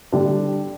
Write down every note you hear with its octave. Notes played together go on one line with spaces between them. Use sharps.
D3 G3 D4